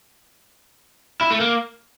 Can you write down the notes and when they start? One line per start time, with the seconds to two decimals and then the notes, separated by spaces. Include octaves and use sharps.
1.21 E4
1.30 A3
1.40 A#3